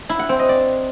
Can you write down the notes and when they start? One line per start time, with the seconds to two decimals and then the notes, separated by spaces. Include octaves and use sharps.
0.09 E4
0.19 F#5
0.29 C4
0.39 D#5
0.49 D5